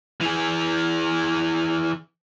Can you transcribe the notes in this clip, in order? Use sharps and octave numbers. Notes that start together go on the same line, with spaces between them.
E3 G#4